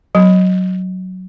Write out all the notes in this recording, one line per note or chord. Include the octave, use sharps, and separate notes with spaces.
F#3